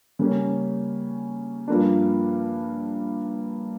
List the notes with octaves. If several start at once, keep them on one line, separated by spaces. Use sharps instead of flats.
C#3 G3 A#3 C#4
G2 F3 A#3 D4